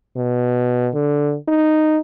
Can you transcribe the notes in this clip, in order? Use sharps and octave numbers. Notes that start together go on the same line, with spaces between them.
B2
D3
D#4